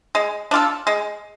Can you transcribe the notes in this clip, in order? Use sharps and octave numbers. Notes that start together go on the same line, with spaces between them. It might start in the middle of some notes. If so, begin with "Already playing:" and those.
G#3
D4 F4 A4
G#3